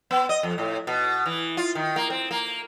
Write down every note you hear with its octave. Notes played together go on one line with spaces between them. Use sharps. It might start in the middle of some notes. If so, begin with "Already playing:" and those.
B3
D#5
F2
A2
B2
E3
F4
D#3
A#3
C4
A#3